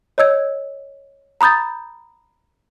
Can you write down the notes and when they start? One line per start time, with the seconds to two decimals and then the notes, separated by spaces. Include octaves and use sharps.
0.18 C#5 D#5 E6 G#6
1.41 A#5 B5 D#6 G6 A6